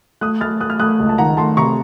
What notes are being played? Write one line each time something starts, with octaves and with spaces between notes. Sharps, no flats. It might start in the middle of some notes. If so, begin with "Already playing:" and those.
A3 D#6 F#6
A3 F6 A6
A3 D#6 F#6
F6
A3 D#6 F#6
C#2
A5
D#3 F#5 A#5
A3 A5 C6
C3 A#5 C#6